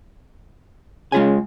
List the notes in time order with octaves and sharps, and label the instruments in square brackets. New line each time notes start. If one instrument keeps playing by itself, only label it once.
[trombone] C#3 [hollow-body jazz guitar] G#3 F4 G#5